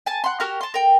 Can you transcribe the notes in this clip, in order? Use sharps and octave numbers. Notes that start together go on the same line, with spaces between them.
G#5 A5
F#5 C6
F#4 G4 A#4 F6
A5 C6
A#4 G5